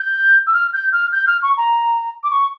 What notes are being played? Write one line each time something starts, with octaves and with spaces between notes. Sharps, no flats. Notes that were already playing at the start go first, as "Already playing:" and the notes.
Already playing: G6
E6
F6
G6
F6
G6
F6
C#6
A#5
D6
C#6